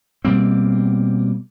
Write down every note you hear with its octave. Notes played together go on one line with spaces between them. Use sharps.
B2 G3 A#3 C4